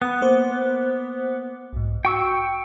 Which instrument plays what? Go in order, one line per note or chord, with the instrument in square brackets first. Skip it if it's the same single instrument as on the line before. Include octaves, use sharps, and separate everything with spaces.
[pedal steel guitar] B3 [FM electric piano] B5 D#6
[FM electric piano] A#3 C5 D6
B1 G#2
[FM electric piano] F#4 [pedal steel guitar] G5 C#6 E6